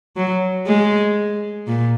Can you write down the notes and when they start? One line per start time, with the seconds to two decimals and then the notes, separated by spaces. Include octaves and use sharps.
0.17 F#3
0.67 G#3
1.67 A#2